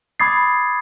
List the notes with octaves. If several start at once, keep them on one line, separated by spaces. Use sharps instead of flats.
B5 D6 D#6 G#6 A6 C7